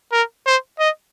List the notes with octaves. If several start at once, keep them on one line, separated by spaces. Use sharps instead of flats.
A#4
C5
D#5